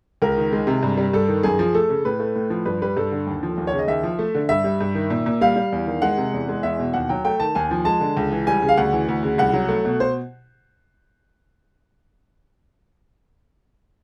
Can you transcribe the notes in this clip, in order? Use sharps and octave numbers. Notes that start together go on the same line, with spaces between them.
C#2 A#4
D#3
G#3
C3
G2
G3
G2 A4
D#3
F#2 G#4
F3
A3 A4
C#3
A2 B4
A3
A2
F3
G2 B4
G3 B4
G2 A4
D3
D#2
F3
D#2
C#5
C#3
D#5
D#2 E5
F3
A3
D3
G2 E5
G3
G2
D#3
A#2
A#2
G3 F5
G3
E2
D#3
G#3 F#5
C3
E2
G#3
E2 E5
B2
D#2 F#5
F#3 G5
A3 G5
D#3 A5
D#2 G#5
F3
G#3 A5
D3
C#2
E3
G3 G#5
C#3
F5
D2 F#5
E3
D2
C#3
C2 F#5
F#3
A3
B2
C5